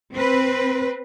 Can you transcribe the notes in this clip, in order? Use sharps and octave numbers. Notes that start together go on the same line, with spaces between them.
C4 B4